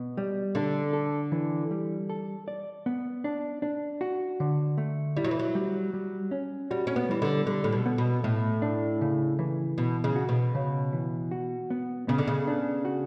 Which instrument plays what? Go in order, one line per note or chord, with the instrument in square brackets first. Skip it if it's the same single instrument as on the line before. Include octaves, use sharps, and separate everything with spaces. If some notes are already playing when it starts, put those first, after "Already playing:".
Already playing: [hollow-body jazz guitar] B2
G3
[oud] D3 [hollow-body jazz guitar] D4
[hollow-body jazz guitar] A4
E3
G3
A4
D5
B3
D4
D4
F#4
D3
A3
[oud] G3 [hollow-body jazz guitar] E4
[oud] F#3
E3
F#3
[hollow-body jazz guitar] G3
G3
C#4
[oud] G3 [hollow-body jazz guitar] F#4
[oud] C#4
B3
[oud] E3 [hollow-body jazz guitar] G3
[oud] D3
[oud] D3 [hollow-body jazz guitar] G3
[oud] A2
B2
[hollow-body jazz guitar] B3
[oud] B2
[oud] A2 [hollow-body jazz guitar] A3
[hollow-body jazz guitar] D4
C#3
E3
[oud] B2 [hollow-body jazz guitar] B3
[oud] C#3
[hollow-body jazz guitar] F#4
[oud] B2
[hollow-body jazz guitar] C#3
E3
F#4
B3
[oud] C#3 [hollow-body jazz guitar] B3
[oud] D3
C#3
[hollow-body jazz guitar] D4
F#4